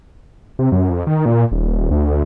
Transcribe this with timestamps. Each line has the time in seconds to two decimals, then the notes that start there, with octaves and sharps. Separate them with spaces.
0.59 C3
0.72 F#2
0.90 F2
1.07 D#3
1.26 A#2
1.52 D#1
1.91 D2